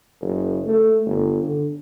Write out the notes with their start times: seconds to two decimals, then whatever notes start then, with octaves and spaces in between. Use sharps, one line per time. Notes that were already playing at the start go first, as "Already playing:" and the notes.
0.21 F#1
0.67 A3
1.06 G1
1.43 D3